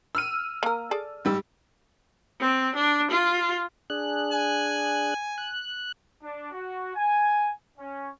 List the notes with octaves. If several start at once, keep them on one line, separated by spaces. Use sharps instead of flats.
E6 F6 D#7
A#3 A#4
G#4 A4 D5
G#2 G3 E6
C4
D4
F4
D4 G#4 F#6
G#5
F#6
D4
F#4
G#5
C#4